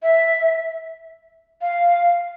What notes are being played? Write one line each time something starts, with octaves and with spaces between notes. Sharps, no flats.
E5
F5